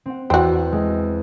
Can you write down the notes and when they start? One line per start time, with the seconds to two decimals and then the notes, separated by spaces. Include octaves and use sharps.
0.06 C4 F#5
0.30 E2 C4 F#4
0.72 G#3